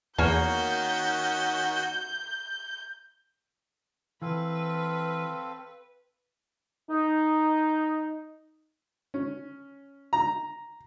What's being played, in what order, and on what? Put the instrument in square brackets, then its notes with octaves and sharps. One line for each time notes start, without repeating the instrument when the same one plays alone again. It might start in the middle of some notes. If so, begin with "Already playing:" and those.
[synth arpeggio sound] E2 G#5 [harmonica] D#3 C#4 F#4 [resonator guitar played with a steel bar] A#3 C#5 [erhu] G6
[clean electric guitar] E3 [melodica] C4 A4 F5 [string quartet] B4
[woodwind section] D#4
[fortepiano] C#4
A#5